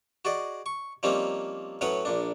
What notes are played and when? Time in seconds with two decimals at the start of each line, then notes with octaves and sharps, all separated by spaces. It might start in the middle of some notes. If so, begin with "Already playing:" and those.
0.25 F#4 G#4 D5 D#5
0.66 C#6
1.03 F3 G3 A#3 C4 C#4 D#4
1.81 A2 F#3 C#4 B4 F#5 D#6
2.05 A#1 A#2 D4